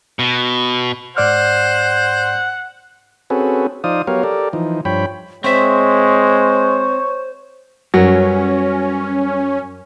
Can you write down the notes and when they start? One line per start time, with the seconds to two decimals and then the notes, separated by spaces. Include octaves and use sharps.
0.19 B2
1.17 G#2 C5 D5 F#5 F6
3.30 C4 C#4 F#4 G#4 A4 B4
3.84 F3 D#4 C5 D5 F5 D#6
4.07 F#3 B3 G4 A#4 C#5 F5
4.23 G4 A4 A#4 D5
4.53 E3 F3 D#4
4.85 G2 F3 C#5 G5 B5
5.44 G#3 C4 C5 C#5 E5
7.94 F#2 F#3 G3 C#4 B4 C#5